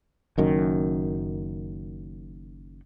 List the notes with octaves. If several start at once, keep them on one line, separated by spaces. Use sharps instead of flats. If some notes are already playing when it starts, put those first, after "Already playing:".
F#1 F#2 D#3